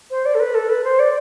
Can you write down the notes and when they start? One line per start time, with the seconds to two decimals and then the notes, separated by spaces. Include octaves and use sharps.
0.10 C5
0.25 D5
0.34 A4
0.39 B4
0.54 A4
0.69 B4
0.84 C5
0.99 D5